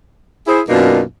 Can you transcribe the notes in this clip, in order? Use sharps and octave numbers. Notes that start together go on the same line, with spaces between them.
E4 G#4 C5
F#2 B2 A#3 D4 D#4 F4